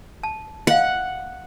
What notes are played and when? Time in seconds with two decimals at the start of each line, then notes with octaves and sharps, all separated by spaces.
0.23 A5
0.67 D#5 F5 F#5